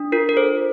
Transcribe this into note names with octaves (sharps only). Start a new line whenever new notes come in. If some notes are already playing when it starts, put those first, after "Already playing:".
Already playing: D4
F4 A#4
A#4
A4 C5